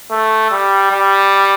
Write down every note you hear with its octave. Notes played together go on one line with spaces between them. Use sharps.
A3
G3
G3